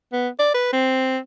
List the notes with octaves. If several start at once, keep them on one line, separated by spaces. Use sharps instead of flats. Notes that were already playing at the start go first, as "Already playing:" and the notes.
B3
D5
B4
C4